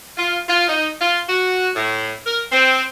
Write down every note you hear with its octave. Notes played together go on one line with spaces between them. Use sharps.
F4
F4
D#4
F4
F#4
A2
A#4
C4